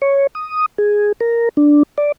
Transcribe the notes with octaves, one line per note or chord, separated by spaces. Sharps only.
C#5
D#6
G#4
A#4
D4
D5